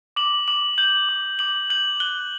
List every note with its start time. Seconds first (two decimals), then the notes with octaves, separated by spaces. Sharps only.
0.16 D6 F#7
0.48 D6 F#7
0.78 G6 F#7
1.09 D6
1.39 D6 F#7
1.70 G6 F#7
2.00 F#6 G7